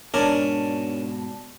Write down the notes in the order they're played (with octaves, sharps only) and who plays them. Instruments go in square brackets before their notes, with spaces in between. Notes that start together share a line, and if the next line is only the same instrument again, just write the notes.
[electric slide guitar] G#2 B2 [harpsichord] C#4 D4 A#4 [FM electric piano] D5 A5